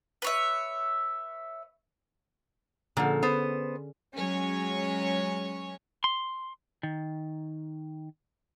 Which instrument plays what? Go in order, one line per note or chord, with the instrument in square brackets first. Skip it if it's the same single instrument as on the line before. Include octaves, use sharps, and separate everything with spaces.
[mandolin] B4 C#5 E5
[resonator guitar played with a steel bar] A#2 F3 [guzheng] D3 C#4 G#4
[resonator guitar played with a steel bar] B3 C5
[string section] F#3 G#3 C#4 C#5
[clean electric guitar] C6
D#3